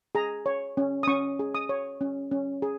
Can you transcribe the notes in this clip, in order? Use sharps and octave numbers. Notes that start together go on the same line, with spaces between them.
G#4 A#5
C#5
C#4
D#6
C#4 C#6
G#4
D#6
C#5
C#4
C#4
G#4